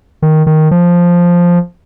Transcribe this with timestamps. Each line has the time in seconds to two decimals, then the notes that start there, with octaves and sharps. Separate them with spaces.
0.22 D#3
0.47 D#3
0.71 F3